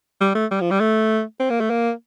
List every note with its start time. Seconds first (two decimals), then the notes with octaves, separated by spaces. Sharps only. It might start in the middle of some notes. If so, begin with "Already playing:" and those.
0.21 G3
0.35 A3
0.51 G3
0.61 F3
0.71 G3
0.80 A3
1.40 C4
1.50 A#3
1.61 A3
1.70 A#3